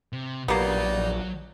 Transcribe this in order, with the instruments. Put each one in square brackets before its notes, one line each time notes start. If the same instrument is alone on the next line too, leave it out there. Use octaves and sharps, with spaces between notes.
[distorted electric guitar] C3
[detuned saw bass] A#1 [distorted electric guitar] F#3 [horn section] G3 D#4 [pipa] A#3 B3